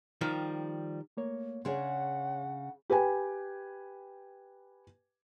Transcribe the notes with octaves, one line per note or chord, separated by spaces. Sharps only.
D#3 F3 G3
A3 A#3 C#5
C#3 D4 G#4 C#5 F#5 C6
G4 B4 G5 G#5